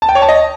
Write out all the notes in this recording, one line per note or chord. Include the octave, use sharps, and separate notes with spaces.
A5
G5
C#5
A5
D#5